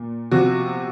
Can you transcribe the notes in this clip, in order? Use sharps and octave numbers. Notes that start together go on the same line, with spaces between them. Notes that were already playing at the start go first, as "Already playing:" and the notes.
Already playing: A#2
C3 F3 F#4